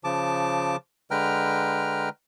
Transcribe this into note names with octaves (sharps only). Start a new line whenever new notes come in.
C#3 F3 A5 D6
D3 G#3 B4 G5 A#5 F6